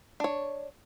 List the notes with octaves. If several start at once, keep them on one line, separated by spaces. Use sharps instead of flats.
D4 C#5